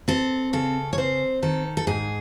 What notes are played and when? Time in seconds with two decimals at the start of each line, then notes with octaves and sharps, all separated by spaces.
0.08 C4 A4
0.53 C#3 A4
0.93 C#5
0.98 C4 C5
1.42 D#3 A4
1.77 A4
1.87 G#2 G#4